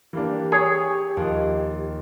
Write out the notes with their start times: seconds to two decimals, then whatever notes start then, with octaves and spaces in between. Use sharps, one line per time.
0.13 E3 A#3 D4 G4
0.52 G#4 C#5
1.17 D#2 F3